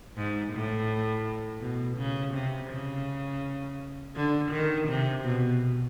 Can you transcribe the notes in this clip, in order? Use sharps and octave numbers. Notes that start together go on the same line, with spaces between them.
G#2
A2
B2
C#3
C3
C#3
D3
D#3
C3
B2